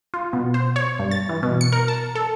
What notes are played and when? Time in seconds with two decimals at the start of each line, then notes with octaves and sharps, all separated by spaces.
0.14 F4
0.33 B2
0.54 C5
0.76 C#5
0.99 G2
1.11 A6
1.29 E3
1.43 B2
1.61 C#7
1.72 A#4
1.88 A5
2.15 A4